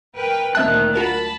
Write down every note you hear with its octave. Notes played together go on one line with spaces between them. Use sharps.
A#4 B4 G5
D2 A#2 D#3 C4 E5 A5 F#6
F4 F#4 A#4 A5 B5